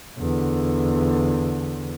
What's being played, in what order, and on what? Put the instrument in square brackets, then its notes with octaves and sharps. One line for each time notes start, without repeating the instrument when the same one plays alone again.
[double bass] E2 D3